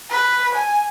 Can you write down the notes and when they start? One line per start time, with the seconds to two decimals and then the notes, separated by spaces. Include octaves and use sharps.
0.11 B4
0.54 G#5